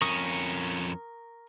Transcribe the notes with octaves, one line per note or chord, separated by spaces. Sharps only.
F2 C#4 A#4 C#6 D#6